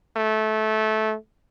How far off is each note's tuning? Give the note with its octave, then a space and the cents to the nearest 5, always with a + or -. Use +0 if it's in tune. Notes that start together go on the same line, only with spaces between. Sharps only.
A3 -20